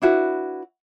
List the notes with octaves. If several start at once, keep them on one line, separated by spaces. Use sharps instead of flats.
D4 E4 F#4 B4